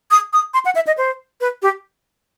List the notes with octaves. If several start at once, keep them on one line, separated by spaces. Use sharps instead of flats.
D#6
D#6
C6
F#5
E5
D#5
C5
B4
G4